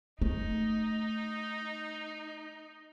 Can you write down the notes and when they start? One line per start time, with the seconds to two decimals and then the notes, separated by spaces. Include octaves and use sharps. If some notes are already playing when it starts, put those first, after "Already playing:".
0.22 A3 D#4